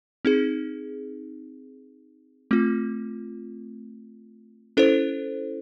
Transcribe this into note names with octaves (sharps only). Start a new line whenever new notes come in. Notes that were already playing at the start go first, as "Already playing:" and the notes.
C4 D#4 G#4
A3 C4 F4
C#4 E4 A4 C5